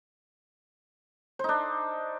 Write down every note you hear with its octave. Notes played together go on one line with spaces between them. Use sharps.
D4 D#4 C5